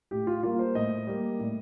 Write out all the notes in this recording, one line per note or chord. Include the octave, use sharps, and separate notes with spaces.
A2 G4
F4
G3 A#3 F4
C5
A2 D#5
G3 A#3
A2